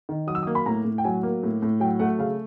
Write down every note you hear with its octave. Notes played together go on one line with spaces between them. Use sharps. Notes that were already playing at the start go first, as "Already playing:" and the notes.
D#3
F#3 D#6
E6
D#6
A#3
B5
A2 A#5
A2
G5
F#3 G#5
A#3
A2
A2
F#3 G5
A3 F#5
C#3 F5